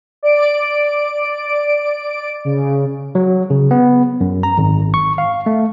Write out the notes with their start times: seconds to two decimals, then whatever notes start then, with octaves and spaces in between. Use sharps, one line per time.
0.23 D5 D7
2.45 C#3
3.15 F#3
3.50 C#3
3.71 B3
4.21 F#2
4.43 A#5
4.58 G#1
4.94 C#6
5.18 F5
5.46 A3